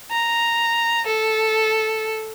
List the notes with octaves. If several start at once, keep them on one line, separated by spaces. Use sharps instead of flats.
A#5
A4